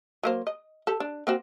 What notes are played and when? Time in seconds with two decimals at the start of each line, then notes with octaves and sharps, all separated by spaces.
0.23 F#3 A#3 C5
0.47 D#5
0.87 G4 A4
1.00 D4
1.27 A#3 C4 F#4